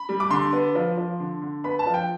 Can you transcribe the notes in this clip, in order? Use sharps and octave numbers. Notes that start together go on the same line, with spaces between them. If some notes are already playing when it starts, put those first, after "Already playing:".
Already playing: B5
G3
D6
D3 C6
B3
F3
F3
D3
D3
B3 B5
A5
F3
G5